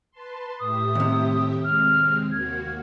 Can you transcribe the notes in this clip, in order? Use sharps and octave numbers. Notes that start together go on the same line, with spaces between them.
B4 A5 C6
A2 G4 E5 D#6
D#2 C3
G#3 C4 F6
D#2 A#3 F#4 G#6